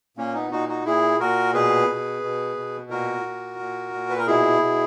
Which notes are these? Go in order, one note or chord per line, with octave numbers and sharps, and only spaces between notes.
A#2 A#3 C#4
B3 D#4
A#2 D#4 F#4
D#4 F#4
A#2 E4 G#4
A#2 F#4 A#4
B2 G#4 B4
B2
B2
B2
A#2 F#4 A#4
A#2
A#2
A#2
B4
A#4
B2 E4 G#4
B2